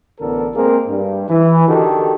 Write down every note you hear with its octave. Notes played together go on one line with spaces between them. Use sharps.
A1 D3 B3 A4 A#4
G#3 A#3 C4 G#4 A#4
G2
E3
D3 D#3 F#4 G4 A4